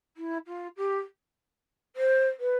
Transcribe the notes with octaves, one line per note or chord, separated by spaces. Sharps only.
E4
F4
G4
C5
B4